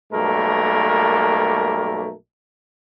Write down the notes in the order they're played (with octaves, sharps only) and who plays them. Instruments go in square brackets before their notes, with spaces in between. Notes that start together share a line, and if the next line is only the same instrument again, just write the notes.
[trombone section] B1 G2 A3 A#3 A#4